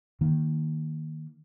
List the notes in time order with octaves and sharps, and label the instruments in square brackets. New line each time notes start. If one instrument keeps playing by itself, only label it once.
[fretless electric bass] D#3 A#3